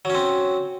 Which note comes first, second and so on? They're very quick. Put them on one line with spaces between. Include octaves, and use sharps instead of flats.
F#3 C#4 C4